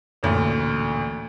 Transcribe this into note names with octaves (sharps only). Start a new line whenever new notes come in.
A1 D2 A#2